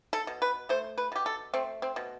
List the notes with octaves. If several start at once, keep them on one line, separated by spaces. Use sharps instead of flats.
A4
B2
B4
A3 C5
B4
B2 G4
A4
A3 C4
C4
B2